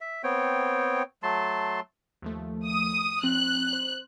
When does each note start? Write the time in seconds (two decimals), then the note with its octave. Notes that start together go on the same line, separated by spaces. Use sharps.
0.01 E5
0.24 B3 C4 C#5 G5
1.23 F#3 A3 A5 C6
2.22 D#2 F3 A3
2.64 D#6
3.23 F3 C4 F#6
3.73 C5